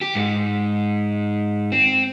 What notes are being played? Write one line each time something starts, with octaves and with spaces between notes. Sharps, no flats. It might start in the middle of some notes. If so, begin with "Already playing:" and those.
G4
G#2
C4